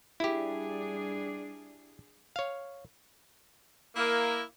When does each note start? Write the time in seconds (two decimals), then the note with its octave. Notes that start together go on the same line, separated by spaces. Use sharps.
0.20 G3 D4 E4 G4 G#4
2.36 C#5 F5
3.96 A#3 E4